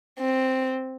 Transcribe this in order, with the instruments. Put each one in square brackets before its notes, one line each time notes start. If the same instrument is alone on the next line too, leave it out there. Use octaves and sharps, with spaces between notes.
[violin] C4